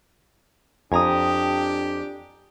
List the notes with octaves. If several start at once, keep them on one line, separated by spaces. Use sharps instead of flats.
F2 D4 G4 G#5 A#5 D#6